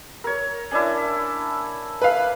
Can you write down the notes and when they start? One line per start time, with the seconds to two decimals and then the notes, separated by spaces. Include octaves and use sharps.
0.24 A#4 C#5
0.71 C#4 D4 E4
2.02 B4 F5